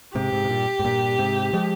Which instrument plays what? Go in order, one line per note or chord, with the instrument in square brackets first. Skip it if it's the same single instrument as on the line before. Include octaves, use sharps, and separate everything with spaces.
[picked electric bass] G#2 C3 [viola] G4
[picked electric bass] G#2 C3
C3
G2 A#2
G#2
G2 A#2
G#2 C3
F3 G#3